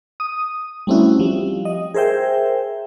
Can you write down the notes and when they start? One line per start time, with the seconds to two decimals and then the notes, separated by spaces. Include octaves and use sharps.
0.20 D#6
0.87 G3 A3 C4 C#4 E4 F#4
1.19 F3 G3
1.65 D#5
1.94 G#4 A#4 C5 E5 G5